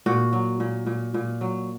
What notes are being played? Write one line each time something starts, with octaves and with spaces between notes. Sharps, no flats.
A#2 F#4
F#3
A#2
A#2
A#2
F#3